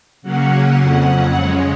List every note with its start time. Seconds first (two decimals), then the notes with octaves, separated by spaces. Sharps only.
0.22 C#3 F#3 A#3 C#4 F#5
0.80 F2 C#3 F#3 C#4
1.37 C#3 G#3 C#4